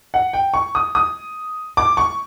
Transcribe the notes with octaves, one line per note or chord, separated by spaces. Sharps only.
F#5
G5
C#6
D#6
D#6
D6
C#6